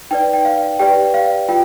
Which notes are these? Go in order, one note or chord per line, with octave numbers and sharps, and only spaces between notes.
D#4 B4 D5 G5
G5
F5
G4 B4 D5 G5
F5
F4 G5